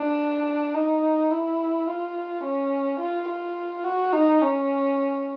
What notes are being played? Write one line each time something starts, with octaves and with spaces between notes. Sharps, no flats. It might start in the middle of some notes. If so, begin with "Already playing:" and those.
Already playing: D4
D#4
E4
F4
C#4
F4
F4
F#4
D#4
C#4